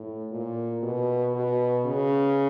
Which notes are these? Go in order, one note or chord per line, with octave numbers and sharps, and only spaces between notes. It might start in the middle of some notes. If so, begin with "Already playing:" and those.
Already playing: A2
A#2
B2
B2
C#3